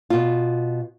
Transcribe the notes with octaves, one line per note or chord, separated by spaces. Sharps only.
B2 F4